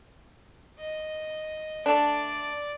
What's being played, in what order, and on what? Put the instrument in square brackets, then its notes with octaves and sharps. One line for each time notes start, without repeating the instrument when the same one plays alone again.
[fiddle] D#5
[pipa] A3 D4 [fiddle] D5